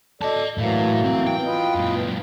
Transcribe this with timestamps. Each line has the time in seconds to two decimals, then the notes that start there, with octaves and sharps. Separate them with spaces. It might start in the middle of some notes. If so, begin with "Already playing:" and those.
0.21 A4 D5 D#5 A5
0.58 A2 E3 F#3 A#3
1.04 C4
1.27 G5
1.45 F4 B4 D#5
1.76 F#2 A#2